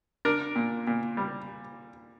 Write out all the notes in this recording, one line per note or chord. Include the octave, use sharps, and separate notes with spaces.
D4 A#4
A#2
A#2
G3